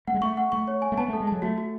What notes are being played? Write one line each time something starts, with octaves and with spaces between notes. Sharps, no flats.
A3 F#5
G#3
A3 C#6
F#5
A3 C#6
C#5
G#5
A3
B3 A5
A3 A4
G#3
F#3 A5
A3 F#4
F#4